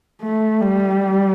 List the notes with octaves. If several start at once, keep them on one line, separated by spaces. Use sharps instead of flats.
A3
G3